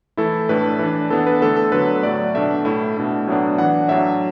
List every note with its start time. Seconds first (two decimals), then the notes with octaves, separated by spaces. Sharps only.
0.17 E3 A3 E4 A4
0.49 A2 A3 D4 B4
0.79 E3 D4
1.10 E3 B3 D4 A4
1.27 B4
1.41 D3 A3 D4 A4
1.56 A4
1.72 D3 F#3 B3 B4
2.03 A2 F#3 A3 D5
2.35 B2 A3 D4 E5
2.65 A2 A3 E4
2.97 B2 A3 D4
3.27 A2 F#3 B3 D4
3.58 E3 D4 F#5
3.88 A2 F#3 D4 E5